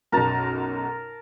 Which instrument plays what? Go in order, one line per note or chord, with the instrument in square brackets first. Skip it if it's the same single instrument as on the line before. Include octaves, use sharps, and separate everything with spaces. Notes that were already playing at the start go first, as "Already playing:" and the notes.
[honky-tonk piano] B1 F#2 [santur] A#4 A5 A#5